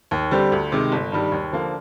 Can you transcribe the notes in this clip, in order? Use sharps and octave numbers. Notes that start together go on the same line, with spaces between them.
D#2
D3 G3 C4 G4
D2
C3 D#3 G#3
G1
G2 D#3 G3
D#2
D3 F3 A#3